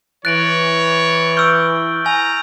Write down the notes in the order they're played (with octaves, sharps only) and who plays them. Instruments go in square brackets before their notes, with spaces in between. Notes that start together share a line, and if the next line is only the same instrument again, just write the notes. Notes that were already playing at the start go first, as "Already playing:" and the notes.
[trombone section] E3 [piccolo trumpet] C#5 [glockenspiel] F#6 A#6 [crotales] A6 D7 F#7
[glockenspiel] C#6 E6 D7 [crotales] F6 G6
[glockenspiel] G#5 [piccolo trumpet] A#5